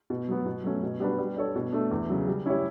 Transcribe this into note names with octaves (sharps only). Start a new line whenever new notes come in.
B2
F#3 B3
B2
F#3 A3 C#4
B2
G3 D4 F#4 B4
G3
D4 A4 C#5
B2
A3 D4
E2
C#3 F#3
G3
C#4 E4 G4 C#5